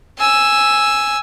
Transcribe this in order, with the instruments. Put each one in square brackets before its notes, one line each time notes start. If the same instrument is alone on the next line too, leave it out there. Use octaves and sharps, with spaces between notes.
[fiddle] G#5 E6